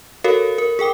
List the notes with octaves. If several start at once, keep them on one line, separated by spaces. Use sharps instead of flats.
F#4 A4 A#4 C#5 F5
A#4
G#4 A#4 G5 D6